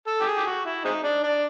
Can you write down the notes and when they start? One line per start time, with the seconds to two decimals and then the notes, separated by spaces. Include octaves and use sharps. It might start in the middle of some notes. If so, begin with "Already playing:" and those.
0.07 A4
0.21 G4
0.27 G#4
0.37 G4
0.46 F#4
0.65 E4
0.85 G#3 C4 D#4
1.04 D4
1.24 D4